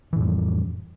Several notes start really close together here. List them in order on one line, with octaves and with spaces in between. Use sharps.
E3 A2 F2 G3